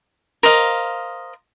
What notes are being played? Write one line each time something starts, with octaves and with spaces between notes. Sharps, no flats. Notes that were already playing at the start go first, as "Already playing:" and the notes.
A#4 C5 D#5 F5